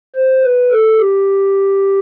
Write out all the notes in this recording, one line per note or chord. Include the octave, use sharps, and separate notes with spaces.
C5
B4
A4
G4